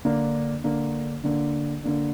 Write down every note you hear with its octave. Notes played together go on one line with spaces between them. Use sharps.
D3 A#3 D4
D3 A#3 D4
D3 A#3 D4
D3 A#3 D4